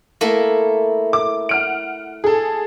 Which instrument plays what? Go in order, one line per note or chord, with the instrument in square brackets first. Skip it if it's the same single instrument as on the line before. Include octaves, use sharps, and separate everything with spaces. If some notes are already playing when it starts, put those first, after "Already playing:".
[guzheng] A3 A#3 E4
[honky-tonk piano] D6
F#5 F6 D7
G#4 A4